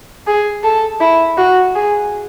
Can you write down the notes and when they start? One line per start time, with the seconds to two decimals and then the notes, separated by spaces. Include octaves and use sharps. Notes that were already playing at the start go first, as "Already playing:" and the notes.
0.27 G#4
0.64 A4
1.00 E4
1.37 F#4
1.76 G#4